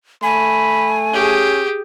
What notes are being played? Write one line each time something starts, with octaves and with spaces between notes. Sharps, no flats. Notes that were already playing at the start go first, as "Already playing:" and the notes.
A3 G#5 B5
C#4 G4 G#4